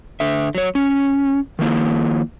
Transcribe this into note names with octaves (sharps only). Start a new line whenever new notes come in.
D3 E5
F#3 C#5
C#4
D#3 F3 A#3 E4